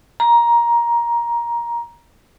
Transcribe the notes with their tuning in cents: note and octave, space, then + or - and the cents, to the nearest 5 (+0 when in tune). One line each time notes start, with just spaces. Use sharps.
A#5 +15